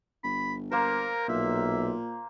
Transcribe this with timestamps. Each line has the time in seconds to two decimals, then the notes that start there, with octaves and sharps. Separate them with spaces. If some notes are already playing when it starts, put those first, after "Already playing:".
0.24 G1 B5
0.71 A#3 A#4 C5
1.29 B1 A#2 E5